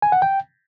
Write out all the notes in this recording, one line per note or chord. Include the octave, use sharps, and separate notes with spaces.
G#5
F#5
G5